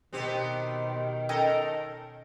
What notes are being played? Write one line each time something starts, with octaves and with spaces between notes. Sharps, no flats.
B2 D#3 B3 C4 G4
C#4 A4 A#4 D#5 G5